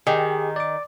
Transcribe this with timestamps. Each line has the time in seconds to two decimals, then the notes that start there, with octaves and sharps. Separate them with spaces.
0.07 D#3 G4 G#4
0.56 D5 D6